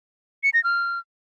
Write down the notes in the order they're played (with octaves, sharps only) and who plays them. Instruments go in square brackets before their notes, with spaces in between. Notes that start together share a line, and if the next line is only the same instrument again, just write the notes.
[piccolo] C#7
A#6
F6